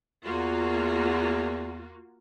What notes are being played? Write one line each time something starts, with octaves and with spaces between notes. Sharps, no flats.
E2 A#3 F4 F#4